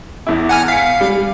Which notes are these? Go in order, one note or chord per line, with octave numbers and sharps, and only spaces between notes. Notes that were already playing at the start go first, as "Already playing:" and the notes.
E2 E4
F#5 G#5 F6
F5 B6 C#7
G3